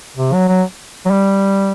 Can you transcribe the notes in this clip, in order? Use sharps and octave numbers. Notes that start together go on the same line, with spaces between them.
C3
F#3
F#3
F#3
G3